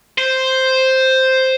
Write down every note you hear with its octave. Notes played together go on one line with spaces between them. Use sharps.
C5